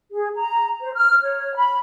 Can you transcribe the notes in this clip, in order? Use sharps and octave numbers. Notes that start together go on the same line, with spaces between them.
G#4
A#5
C5
F6
C#5
B5